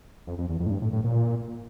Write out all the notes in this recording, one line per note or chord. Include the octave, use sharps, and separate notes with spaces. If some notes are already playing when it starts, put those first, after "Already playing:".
F2
F2
E2
F2
A2
G2
A2
A2
A#2